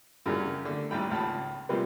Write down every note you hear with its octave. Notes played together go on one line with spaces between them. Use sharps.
F#2 C#3 E3 F#3 G3
D3 A3
A1 D#2 G3 G5 B5
G#1 C#2 A5 B5
C3 F3 G3 G#3 A#3 B3